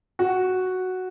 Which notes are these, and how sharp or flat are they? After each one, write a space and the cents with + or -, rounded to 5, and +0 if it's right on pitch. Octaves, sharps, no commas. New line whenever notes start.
F#4 +0